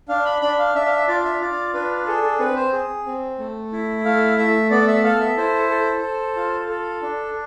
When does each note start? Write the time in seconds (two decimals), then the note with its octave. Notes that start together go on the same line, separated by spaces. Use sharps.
0.08 D4 F5
0.25 B5
0.41 D4 B5
0.59 F5
0.75 D4 E5
0.87 F5
0.91 E5
1.08 F4 D5
1.25 E5
1.41 F4 D5
1.74 D4 B4
2.07 G#4 A4
2.24 A4
2.39 C4 B4
2.56 C5
2.72 G#4
3.06 C4
3.39 A3
3.72 E4
4.05 A3 F5
4.38 A3 E5
4.70 B3 D5
4.88 E5
5.04 A4 F5
5.20 E5
5.37 E4 C5
5.70 A4
6.02 A4
6.36 F4
6.69 A4
7.02 D4